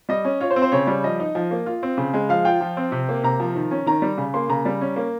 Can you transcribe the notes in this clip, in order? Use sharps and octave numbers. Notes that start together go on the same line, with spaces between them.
G3 D#5
C#4
F4 C#5
C5
C4
C5
C#3 C#5
G3
F3 D#5
D#4
F3
A#3
F4
C4
C#3
G#3
F3 F5
F4 G5
F3
C4
C3
A#3
C3 A#5
F3
D#3
C#4
D#3 A#5
G3
C#3
A#3 C6
C#3 A#5
G3
C#4
A#3